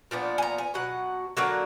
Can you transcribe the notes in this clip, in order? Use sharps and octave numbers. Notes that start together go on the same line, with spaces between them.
A#2 F3 B3 D4
G#5
A#5
G#5
B2 F#3 F#5
D3 F#3 A#3 F#5